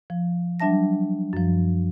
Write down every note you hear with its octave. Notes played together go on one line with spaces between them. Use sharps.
F3
F#3 G3 D4 E5 A5 A#6
F#2 F3